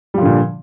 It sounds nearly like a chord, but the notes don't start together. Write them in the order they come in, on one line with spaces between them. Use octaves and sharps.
G3 F3 D3 A#2